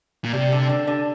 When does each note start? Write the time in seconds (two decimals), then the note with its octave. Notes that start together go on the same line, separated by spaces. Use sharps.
0.25 A#2
0.33 C3 G3
0.52 D3
0.69 D3
0.87 D3